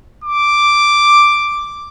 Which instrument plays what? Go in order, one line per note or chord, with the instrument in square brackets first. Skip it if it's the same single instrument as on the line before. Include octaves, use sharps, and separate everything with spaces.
[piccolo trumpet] D6